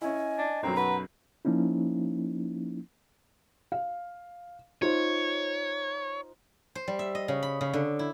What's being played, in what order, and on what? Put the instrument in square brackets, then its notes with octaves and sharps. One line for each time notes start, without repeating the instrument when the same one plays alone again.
[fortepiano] C#4 E4 [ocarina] D#5 [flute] G#5
[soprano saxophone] D4
[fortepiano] B1 F#2 F#3 [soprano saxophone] C4 [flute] A#5
[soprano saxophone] B4 [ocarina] F#5
[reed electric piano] F3 A#3 C#4 D#4 E4
[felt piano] F5
[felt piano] D#4 F4 C5 [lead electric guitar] C#5
[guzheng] C5
G3
E5
D#5
C#3
B5
C#3
D3
E4